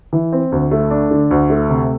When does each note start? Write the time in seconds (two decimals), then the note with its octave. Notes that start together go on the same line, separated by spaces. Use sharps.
0.13 E3
0.32 C4
0.52 D2
0.71 A3
0.91 D4
1.11 D3
1.31 D2
1.50 A3
1.70 C3